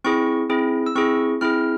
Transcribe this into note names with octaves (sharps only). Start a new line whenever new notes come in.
C4 E4 G#4 C#6
C4 E4 G#4
E6
C4 E4 G#4 C#6
C4 E4 G#4 F6